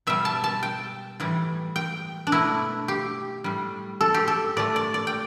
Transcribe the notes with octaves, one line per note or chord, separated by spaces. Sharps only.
B2 G3 E5
A5
A5
G5
A2 E3 G3
G5
D4
B2 A3 E4
G4
A2 G3
A4
G4
A4
A2 A3 D5
D5
D5
G5